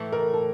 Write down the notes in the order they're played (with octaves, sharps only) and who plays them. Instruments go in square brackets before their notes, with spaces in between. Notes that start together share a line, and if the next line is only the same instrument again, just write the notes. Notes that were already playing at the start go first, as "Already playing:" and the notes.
Already playing: [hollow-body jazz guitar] A2 E3 A3
[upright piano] A#4
A4